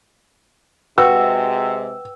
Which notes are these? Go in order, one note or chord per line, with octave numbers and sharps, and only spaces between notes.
C3 G#3 F#4 B4 G5 E6